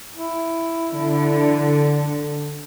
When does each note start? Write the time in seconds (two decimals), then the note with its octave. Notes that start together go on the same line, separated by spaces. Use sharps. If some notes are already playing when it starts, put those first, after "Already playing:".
0.15 E4
0.93 D3